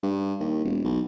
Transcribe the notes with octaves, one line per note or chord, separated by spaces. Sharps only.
G2
D#2
E1
B1